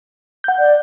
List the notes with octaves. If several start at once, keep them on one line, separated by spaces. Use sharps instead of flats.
F#5 G6
D5